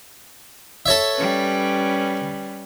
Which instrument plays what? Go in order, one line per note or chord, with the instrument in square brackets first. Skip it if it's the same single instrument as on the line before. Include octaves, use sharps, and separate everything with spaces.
[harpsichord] A4 C#5 E5
[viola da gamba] G3 C#4 B4